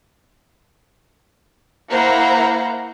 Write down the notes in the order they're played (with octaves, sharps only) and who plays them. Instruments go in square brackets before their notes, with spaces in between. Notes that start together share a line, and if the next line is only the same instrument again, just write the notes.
[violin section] A#3 E4 C5 F5 F#5 A#5